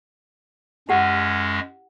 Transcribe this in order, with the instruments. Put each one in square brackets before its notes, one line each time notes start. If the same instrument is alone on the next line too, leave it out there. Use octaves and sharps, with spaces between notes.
[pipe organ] F#2 G#3 C#4 [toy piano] E4 G4 F#5